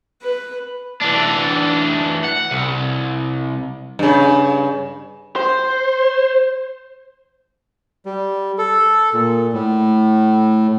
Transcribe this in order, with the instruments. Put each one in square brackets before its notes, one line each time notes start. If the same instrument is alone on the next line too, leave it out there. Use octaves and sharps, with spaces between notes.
[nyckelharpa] B4
[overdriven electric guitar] E3 D4
F#5
C2
[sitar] G2 C#3
[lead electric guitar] C5
[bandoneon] G3
A4
A#2
A2